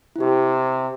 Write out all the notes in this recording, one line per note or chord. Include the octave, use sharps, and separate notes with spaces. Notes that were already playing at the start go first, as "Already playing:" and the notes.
E4
C3 G4